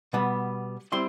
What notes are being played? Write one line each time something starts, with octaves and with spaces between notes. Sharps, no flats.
B2 G3 B3
G3 C4 E4 C6